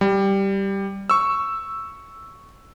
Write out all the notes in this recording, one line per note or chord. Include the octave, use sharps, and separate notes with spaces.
G3
C#6 E6